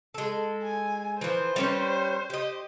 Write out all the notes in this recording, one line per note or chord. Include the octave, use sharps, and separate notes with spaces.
G#3 A4
G#5
E3 F3 C5
G3 C#4 B4
G4 D#5